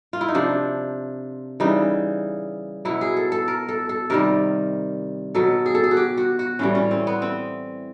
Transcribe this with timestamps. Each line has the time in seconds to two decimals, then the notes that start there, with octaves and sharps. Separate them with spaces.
0.13 F4
0.21 E4
0.29 D#4
0.35 C3 F3 D4
1.60 C#3 E3 G3 D#4
2.85 B2 F#3 E4
3.01 G#4
3.17 A4
3.32 A4
3.48 A#4
3.69 A4
3.89 A4
4.10 C3 D#3 G3 A#4
5.35 B2 F#3 A4
5.66 G#4
5.75 A4
5.84 G#4
5.91 F#4
5.97 G4
6.17 F#4
6.39 F#4
6.59 A2 E3 G3 C#4
6.75 C#4
6.91 C4
7.07 B3
7.22 C4